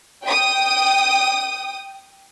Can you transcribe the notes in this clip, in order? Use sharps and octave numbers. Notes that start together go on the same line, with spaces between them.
G5 D#6